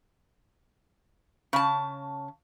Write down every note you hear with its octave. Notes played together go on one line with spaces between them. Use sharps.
C#3 A5